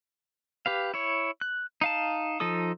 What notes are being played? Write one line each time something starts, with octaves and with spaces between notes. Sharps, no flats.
G4 B4 F5
E4 C#5
F#6
D#4 F5 A5
F3 D#4 A4 D#6